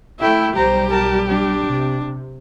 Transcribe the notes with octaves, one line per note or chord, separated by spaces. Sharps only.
A3 E4 E5 G5
B1 G3 G4 C5 A#5
A#4 A5
D4
C3